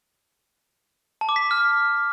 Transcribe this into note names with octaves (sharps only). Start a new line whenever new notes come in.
A5
D6
B6
A5
F6